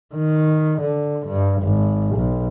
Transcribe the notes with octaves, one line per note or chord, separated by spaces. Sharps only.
D#3
D3
G2
G#1
B1